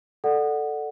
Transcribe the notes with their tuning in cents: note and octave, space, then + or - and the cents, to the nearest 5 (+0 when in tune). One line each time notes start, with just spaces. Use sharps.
A4 +0 D5 +20 F#5 +0